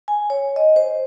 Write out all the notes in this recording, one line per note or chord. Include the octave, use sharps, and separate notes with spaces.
G#5
C#5
D#5
C5